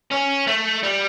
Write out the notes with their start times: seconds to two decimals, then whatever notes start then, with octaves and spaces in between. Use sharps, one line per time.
0.12 C#4
0.47 A3
0.83 G3